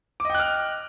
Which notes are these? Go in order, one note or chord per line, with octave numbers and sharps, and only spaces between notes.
D#5 G5 D6 F6 F#6